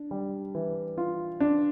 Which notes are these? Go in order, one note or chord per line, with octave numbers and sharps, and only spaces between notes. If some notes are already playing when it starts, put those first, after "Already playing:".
Already playing: D4
G3
E3
F4
D4